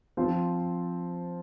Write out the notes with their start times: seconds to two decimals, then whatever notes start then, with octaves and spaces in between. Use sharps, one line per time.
0.17 F3 C4 F4 C5